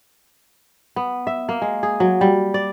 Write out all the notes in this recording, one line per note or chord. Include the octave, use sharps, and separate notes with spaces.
B3
E5
A#3
G#3
G#4
F#3
G3
D5